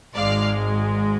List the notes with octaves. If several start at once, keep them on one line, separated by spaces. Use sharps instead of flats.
G#1 G#2 G#3 D5 F5